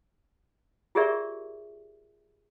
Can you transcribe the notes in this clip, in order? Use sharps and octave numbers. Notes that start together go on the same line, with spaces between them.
F4 G4 G#4 A#4 D5 E5